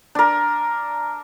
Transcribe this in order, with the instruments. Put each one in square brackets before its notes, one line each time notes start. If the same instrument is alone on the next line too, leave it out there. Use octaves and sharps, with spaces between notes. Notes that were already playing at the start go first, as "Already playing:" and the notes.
[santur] D4 A#4